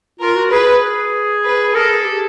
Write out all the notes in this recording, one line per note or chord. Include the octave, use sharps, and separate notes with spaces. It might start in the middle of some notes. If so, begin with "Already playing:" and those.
F4 A#4
F#4
G#4 B4
B4
A4 A#4
G#4
G4